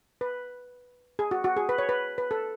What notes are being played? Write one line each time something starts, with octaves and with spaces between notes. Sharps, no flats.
B4
G#4
F#4
F#4
G#4
B4
C#5
B4
B4
A4